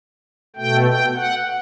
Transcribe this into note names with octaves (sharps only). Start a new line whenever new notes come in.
B2 A3 G5
G5
F#5